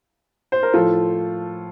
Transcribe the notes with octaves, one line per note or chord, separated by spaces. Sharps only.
C5
A#4
A2 F3 F4 A4